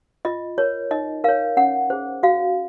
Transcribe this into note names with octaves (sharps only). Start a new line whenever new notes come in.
F4 D#5
A#4 C#5
D#4 D#5
A#4 C#5 F5
C#4 F#5
G#4 C5
F#4 F5